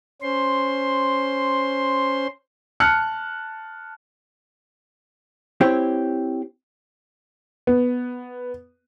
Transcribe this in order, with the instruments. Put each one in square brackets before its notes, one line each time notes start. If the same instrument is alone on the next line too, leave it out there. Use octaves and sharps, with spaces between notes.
[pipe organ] C#4 C5 C6
[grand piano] A5 F6 F#6 C#7
[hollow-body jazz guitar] C4 E4 G4 C#5
[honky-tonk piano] B3